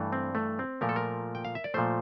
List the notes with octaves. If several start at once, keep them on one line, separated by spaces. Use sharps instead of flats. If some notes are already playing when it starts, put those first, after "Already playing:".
Already playing: G2 E3 A3
C4
A3
C4
A#2 F3 A3 A#4
A4
A#4
G5
F5
E5
D5
A#2 F3 A3 C5